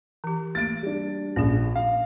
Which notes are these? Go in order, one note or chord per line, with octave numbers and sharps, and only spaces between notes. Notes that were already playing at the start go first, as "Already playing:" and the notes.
E3 G4
A3 A#3 A6 D7
G3 D4
A#1 C#4 G#4
F5